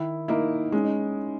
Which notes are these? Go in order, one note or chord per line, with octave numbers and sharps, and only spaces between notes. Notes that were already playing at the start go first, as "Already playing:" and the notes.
Already playing: D#3 E4
A#3 D#4 E4
G#3 C#4
D#4